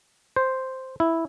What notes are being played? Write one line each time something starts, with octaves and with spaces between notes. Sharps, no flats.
C5
E4